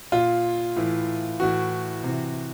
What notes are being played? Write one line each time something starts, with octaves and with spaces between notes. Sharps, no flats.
A#2 F4
A2 E3
A2 E3 F#4
C3
E3